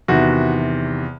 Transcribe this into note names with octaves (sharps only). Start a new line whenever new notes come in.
E2 C3 D#3 F#4